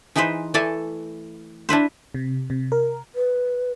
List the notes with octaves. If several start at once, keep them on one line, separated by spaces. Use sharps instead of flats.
E3 D#4 G#4 B4 C5
E3 A3 A4 D5 G#5 A5
D4 E4 B4 C5
C3
C3
A#4
B4